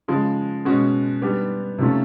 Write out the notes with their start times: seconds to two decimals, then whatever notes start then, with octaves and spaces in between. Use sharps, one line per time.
0.08 C#3 F3 G#3
0.65 B2 G#3 C#4 F#4
1.22 G3 B3 D4 G4
1.78 C3 F3 A3 C#4 F4